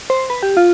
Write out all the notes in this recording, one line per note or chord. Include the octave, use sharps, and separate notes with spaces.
C5
B4
G4
F4